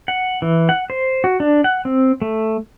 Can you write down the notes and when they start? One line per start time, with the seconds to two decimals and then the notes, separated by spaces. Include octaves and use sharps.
0.08 F#5
0.42 E3
0.69 F#5
0.90 C5
1.24 F#4
1.40 D4
1.64 F#5
1.85 C4
2.22 A3